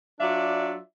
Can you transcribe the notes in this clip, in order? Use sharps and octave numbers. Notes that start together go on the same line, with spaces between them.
F#3 D4 F4 D5 E5